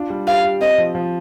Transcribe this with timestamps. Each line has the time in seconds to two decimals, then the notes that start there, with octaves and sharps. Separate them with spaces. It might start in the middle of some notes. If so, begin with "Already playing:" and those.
Already playing: D4 F4
0.10 G3
0.27 G4 F5
0.44 G4
0.61 C4 D#5
0.78 F3
0.95 F3